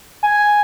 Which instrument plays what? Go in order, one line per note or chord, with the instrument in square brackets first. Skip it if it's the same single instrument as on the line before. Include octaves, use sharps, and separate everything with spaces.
[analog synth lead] G#5